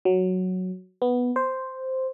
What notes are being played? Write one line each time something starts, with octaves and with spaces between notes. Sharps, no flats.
F#3
B3
C5